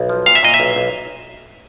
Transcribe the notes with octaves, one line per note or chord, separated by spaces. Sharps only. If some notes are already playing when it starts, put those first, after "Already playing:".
Already playing: B1
F3
A#2 F5
E5
A#2 D#5
E5
B1
B1